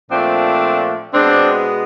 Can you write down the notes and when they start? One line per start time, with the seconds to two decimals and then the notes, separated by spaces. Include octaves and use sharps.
0.11 A#2 F3 A3 C4 D4
1.13 B2 G#3 B3 C4 D4